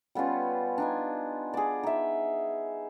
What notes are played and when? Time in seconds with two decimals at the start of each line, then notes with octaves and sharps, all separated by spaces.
0.15 G3 B3 C#4 F4
0.78 D4 D#4 G#5
1.54 G#4 D5
1.83 D#4 E5